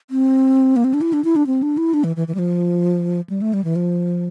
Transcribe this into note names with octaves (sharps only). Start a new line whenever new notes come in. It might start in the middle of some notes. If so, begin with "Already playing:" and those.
C4
A#3
C4
D4
E4
D4
E4
D4
C4
D4
E4
D4
E3
E3
E3
G3
F3
G3
A3
G3
E3
F3